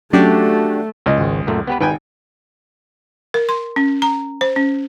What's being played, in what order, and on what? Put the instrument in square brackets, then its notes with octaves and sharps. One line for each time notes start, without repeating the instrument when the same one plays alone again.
[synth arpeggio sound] F#3 C#4 [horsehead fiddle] A3 [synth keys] D4 F#4 G4
[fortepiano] C#2 D#5
[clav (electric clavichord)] G#1
F#2 A#2 A3
B3 G4 B4
[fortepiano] G#1 G5 G#5 [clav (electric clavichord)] B4
[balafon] A#4
C6
C#4
A#5
C5
C#4